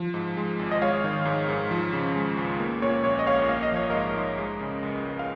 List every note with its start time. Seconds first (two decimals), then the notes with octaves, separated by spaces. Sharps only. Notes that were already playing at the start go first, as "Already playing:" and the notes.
Already playing: F3
0.14 G#2
0.37 G#3
0.59 G#1
0.71 D#5
0.81 G#3 C#5 F5
1.04 D#3
1.25 G#2
1.49 G#2
1.71 F3
1.93 C#3
2.16 G#3
2.37 C#2
2.60 A#3
2.82 A#2 C#5
3.04 A#1 C#5
3.19 D#5
3.27 A#1 C#5 F5
3.49 A#3 F5
3.63 D#5
3.72 F3 C#5
3.90 G#2 A#4 D#5
4.17 G#2
4.38 G#3
4.61 C#3
4.83 C#2
5.05 C#2
5.19 F5